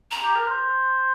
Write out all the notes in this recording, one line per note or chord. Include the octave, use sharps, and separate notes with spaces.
A#5
G4
A#4
C5